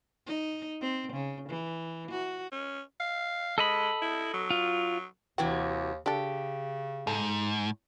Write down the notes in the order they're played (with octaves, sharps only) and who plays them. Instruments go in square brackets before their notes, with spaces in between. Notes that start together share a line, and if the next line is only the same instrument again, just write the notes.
[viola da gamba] D#4
C4
C#3
E3
F#4
[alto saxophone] C#4
F5
[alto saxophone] G#3 [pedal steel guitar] A4 D#5 B5
[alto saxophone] E4
F#3
[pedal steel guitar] F4
[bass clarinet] D#2 [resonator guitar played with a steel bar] C3 E3 F#4 [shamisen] G5
[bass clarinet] C#3 [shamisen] D4 A4 [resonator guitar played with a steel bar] G4
[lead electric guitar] G#2 [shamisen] A4